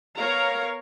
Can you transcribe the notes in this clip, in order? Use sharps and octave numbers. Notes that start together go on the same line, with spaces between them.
B3 A#4 C#5 F5 A#5